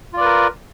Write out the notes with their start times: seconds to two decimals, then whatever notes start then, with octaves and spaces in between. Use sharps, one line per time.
0.13 F4
0.17 D5
0.21 B4
0.25 A#4